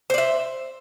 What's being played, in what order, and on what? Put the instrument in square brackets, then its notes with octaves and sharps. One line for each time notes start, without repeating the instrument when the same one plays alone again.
[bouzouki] C5
D5
E5